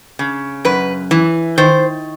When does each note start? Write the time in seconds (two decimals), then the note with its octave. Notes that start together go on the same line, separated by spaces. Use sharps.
0.19 C#3
0.65 F#2 B4
1.11 E3
1.58 D#3 C5